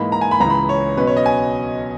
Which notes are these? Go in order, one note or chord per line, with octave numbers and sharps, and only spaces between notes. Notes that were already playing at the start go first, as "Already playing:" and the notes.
Already playing: G#2 E3 A#3 D#4 B5
A#5
G#5
B5
C#2 C#3 E3 A#5
B5
C#5
B1 B2 F#3 C#4 B4
C#5
D#5
G#5